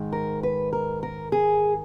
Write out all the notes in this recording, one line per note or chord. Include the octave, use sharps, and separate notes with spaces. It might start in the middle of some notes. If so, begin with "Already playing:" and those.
Already playing: G#2 D#3 G#3
A#4
B4
A#4
A#4
G#4